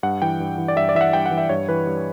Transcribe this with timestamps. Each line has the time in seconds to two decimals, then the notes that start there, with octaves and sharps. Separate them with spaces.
0.03 G2 F#5
0.22 E3 G5
0.40 G2
0.58 E3
0.68 D5
0.76 G2 E5
0.89 D5
0.95 E3 E5
1.01 F#5
1.13 G2 G5
1.26 F#5
1.31 E3
1.38 E5
1.49 G2 C#5
1.69 E3 B4
1.87 G2